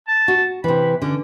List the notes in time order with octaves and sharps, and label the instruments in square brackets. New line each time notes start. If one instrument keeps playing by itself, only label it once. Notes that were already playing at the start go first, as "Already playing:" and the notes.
[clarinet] A5
[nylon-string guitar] F#4
[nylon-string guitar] C3 E3 [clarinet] B5
[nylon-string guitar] D3 [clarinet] C#4